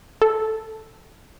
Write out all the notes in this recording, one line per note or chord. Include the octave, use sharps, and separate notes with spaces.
A4